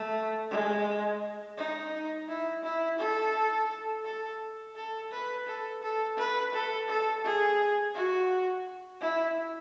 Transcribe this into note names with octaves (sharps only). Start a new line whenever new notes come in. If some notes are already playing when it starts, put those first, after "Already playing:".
Already playing: A3
G#3
D#4
E4
E4
A4
A4
A4
B4
A4
A4
B4
A4
A4
G#4
F#4
E4